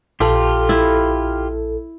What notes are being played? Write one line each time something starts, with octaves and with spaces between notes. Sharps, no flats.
A#1 F4 G4 A4
E4